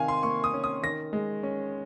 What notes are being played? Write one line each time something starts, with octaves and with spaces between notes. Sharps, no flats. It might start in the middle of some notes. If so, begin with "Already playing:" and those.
Already playing: C3 D#3 F5 G#5
C6
A#3 C#6
D#6
C#4
D#6
D#3 A#6
G#3
C#4